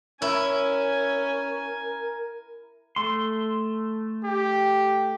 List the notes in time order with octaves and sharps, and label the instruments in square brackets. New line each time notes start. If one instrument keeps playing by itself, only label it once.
[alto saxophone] C#4 [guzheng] E4 [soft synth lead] A#4 [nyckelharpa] G#5
[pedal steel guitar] A3 C6
[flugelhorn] G4